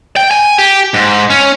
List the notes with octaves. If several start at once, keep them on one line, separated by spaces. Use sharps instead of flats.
G5
G#5
G4
G#2
C#4